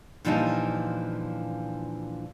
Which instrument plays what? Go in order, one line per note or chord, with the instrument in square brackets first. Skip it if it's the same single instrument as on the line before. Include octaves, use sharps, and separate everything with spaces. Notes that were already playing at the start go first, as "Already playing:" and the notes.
[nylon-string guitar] A#2 D3 E3 F3 G3 D#4